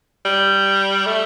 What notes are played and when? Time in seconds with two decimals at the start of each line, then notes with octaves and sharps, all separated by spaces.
0.25 G3
1.06 A3